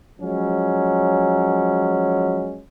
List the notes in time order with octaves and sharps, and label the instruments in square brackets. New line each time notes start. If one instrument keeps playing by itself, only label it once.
[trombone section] F3 F#3 G#3 C#4